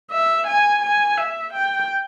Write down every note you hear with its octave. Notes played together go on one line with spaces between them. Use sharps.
E5
G#5
G#5
E5
G5